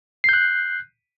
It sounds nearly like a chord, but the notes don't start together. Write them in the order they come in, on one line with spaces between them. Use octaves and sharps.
C7 G6 F#6